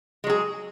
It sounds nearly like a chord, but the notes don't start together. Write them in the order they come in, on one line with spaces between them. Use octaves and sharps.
G#3 F#3 G#4